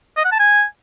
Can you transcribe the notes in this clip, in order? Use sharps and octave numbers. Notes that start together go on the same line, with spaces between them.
D#5
F#5
A5
G#5